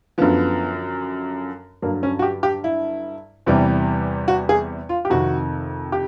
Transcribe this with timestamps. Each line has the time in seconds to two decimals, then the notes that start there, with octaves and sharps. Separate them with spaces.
0.18 F#2 D3 F3 B3
1.82 G2 D3 F#3 A#3
2.03 C#4
2.19 F#4
2.22 G4
2.43 G4
2.64 E4
3.46 E2 C3 E3 G3
4.28 F#4
4.49 G#4
4.89 F4
5.05 G4
5.10 F2 C3 D#3 F#4
5.92 G4